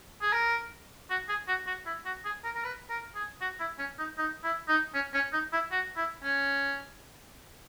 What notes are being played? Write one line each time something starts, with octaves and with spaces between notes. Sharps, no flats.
G#4
A#4
F#4
G#4
F#4
F#4
E4
F#4
G#4
A#4
A#4
B4
A#4
G#4
F#4
E4
C#4
D#4
D#4
E4
D#4
C#4
C#4
D#4
E4
F#4
E4
C#4